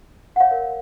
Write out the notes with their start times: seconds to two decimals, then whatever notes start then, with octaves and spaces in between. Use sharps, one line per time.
0.36 F#5
0.40 C#5 F5
0.51 A#4 C#5